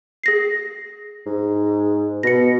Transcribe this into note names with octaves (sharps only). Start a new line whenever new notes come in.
G#4 A#6 C7
G#2
B2 A#6 C#7